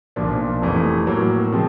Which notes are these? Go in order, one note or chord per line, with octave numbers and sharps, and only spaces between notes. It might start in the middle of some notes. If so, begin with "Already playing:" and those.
B1 A#2 F3 A#3 D4
F1 F2 C3 E3 A3
A2 F#3 A#3
C3 F3 G#3 C4